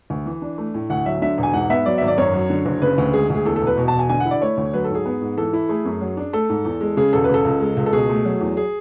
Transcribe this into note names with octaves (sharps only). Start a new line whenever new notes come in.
D2
E3
D4
A3
A2
D2 F#5
F#3 E5
D3 E5
E1
G#5
G#2 F#5
B3 E5
F#3 D5
G#1 E5
D5
F#2 C#5
F#3
D3
F#1
C#3 B4
D2
G#3 G#4
D2
G#4
E2 A4
A4
E1
B4
B2
A5
E1
G#5
D3 G#5
F#5
E4
D5
A3 C#5
D2
F#3 B4
A4
G#2
G#4
B3
G#2
E3 A4
E4
A3 G#4
F#2
F#3
D4
A3 A4
G#2
E2
G#3
C#3 G#4
E1 A4
B4
C#3 A4
C#2
G#3
C#2
A4
B2 G#4
A3
F#3
E2
G#4